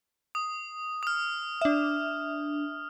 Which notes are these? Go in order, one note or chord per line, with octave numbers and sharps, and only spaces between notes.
D#6
D#6 F6
D4 E5